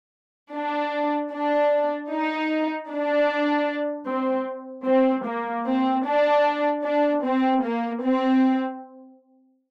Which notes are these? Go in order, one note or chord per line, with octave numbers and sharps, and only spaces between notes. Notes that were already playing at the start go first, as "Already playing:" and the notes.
D4
D4
D#4
D4
C4
C4
A#3
C4
D4
D4
C4
A#3
C4